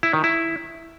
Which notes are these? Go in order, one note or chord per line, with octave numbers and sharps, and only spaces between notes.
E4
D#3
E4